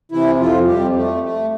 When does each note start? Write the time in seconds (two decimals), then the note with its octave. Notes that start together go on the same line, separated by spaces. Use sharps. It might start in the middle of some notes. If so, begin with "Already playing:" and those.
0.12 C3 E3 E4
0.39 F2 F3 F4
0.67 F2 G3 G4
0.95 A3
1.23 A3